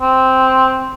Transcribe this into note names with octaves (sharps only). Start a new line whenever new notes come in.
C4